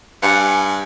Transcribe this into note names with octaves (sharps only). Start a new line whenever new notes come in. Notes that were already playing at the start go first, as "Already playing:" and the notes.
G2 F5 F#5 G#5